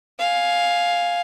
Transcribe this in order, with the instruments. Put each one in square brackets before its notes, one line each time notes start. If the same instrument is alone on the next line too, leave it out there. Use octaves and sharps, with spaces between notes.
[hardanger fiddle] F5 G#5